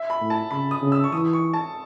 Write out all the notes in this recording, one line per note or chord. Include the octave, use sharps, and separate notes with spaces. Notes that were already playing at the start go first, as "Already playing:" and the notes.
Already playing: E5
B5
A2
A5
C#3 B5
D#6
C#3
E6
C#6
E3 D#6
C#6
A5